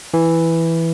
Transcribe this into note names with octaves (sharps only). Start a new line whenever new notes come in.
E3